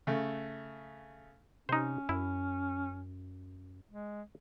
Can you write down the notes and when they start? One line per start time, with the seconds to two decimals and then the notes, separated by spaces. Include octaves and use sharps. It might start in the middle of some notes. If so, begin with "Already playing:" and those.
0.07 C#3 A3
1.69 C3 C#4 D#4 C5
2.09 F#2 E4
3.90 G#3